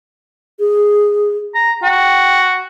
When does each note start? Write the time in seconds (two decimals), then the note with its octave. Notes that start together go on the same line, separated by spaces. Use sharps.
0.60 G#4
1.55 A#5
1.83 F#4 G5